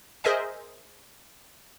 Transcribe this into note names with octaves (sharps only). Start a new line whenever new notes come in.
G#4 A#4 C5 D#5 E5 G#5